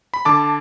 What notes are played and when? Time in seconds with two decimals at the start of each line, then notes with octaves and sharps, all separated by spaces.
0.14 B5
0.25 D3 A5 D6